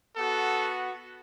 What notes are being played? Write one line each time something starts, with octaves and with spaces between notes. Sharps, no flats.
B3 F#4 A4